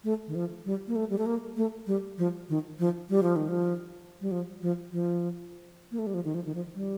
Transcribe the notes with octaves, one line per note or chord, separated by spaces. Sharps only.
A3
D#3
F3
G3
A#3
A3
G3
A3
A#3
A3
G3
F3
D#3
F3
G3
F3
D#3
F3
G3
F3
F3
F3
A#3
A3
G3
F3
D#3
F3
D#3
F3
G3